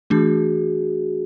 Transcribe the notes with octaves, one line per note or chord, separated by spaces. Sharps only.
E3 A3 D4 F#4 G#4